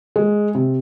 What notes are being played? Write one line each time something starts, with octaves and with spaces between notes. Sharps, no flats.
G#3
C3